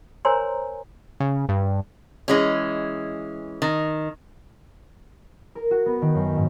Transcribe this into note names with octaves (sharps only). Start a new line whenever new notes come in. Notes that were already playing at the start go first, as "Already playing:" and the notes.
A#4 C5 C#5 G#5 A#5 C6
C#3
G2
E3 G#3 C#4
D#3
A#4
F#4
B3
D#3
F#2
G#2